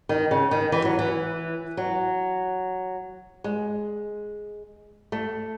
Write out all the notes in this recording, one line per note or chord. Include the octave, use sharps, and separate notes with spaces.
D#3
C#3
D#3
E3
F#3
E3
F#3
G#3
A3